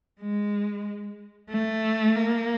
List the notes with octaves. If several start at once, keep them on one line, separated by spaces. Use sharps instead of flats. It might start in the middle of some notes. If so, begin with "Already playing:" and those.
G#3
A3
A#3